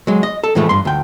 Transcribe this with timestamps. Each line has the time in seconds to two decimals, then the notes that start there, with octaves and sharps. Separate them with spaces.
0.07 F#3 G#3
0.23 D#5
0.44 A4
0.55 A2 E3 F3 G#3 A3
0.69 G2 C6
0.85 D2 G5